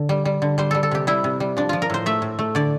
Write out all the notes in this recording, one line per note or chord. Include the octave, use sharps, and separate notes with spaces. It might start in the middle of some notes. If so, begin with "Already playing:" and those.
Already playing: D3
G3
G3
D3
G3 C5
G3 A4
A4
C3 G4
G3 E4
C3
G3
F3 D4
F3 F4
A#4
A2 C5
A3 E5
A2
A3
D3 D5